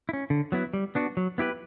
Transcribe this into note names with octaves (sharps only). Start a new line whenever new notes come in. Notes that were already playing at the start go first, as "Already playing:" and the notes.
E4
C#4
D3
F#3 B3 E4
G3
B3 D4 F#4
F#3
B3 E4 G4 B4